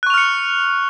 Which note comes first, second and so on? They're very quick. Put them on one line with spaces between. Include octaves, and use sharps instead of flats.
F#6 C#6 F7 F6 C#7